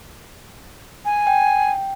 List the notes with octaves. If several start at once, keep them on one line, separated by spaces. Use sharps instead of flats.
G#5
G5